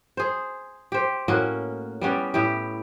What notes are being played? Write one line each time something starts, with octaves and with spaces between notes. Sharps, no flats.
G#4 C5
G4 C5
A2 A#3 C#4 F#4
G3 B3 C#4 G4
A2 E4 G4